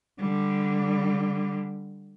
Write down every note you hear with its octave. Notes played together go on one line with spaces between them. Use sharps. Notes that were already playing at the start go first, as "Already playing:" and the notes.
D3 G3